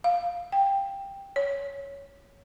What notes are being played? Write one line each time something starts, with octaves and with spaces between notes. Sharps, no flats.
F5
G5
C#5